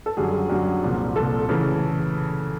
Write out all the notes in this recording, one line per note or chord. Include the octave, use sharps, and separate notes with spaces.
A4
F#2 D3 G3 G#4
F#2 D3 G3
C2 A#2 F3
C2 A#2 F3 A4
C#3 E3 A3